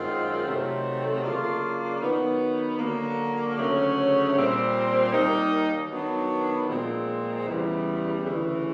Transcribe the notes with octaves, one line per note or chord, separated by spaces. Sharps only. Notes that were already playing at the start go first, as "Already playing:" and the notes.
Already playing: F#2 D#3 G#3 C4 F4
C3 D#3 F#3 A3 C4
C#3 F#3 A#3 D4 F4
D#3 F#3 B3
D3 F#3 A#3
D2 C#3 F#3 A3 C#4
A#2 G3 C4
D#2 D#3 G3 A#3 D#4
D#3 F#3 B3 D4
A#2 F3 G#3 C4
E2 C#3 E3 G3
D2 C#3 E3